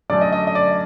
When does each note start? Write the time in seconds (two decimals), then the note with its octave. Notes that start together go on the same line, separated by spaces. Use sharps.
0.10 F#2 D3 A3 D5
0.21 D#5
0.32 D#5
0.47 D#5
0.55 D5